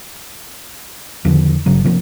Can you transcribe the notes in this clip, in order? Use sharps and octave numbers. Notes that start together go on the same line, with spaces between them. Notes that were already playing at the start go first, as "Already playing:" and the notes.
E2 D3 D#3 F3
G1 G2 C#3 F#3
C3 F3 A#3